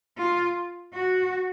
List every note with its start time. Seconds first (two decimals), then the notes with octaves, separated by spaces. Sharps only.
0.18 F4
0.94 F#4